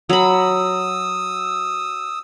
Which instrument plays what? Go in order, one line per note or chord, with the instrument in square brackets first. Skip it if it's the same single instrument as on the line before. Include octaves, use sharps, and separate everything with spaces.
[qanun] F#3 B5 [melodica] D#6 E6